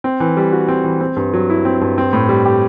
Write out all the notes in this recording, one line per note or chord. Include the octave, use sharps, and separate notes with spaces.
C4
E3
G3
F#4
C4
E3
C4
G2
F#3
E4
C4
G2
C4
A2
G3
G4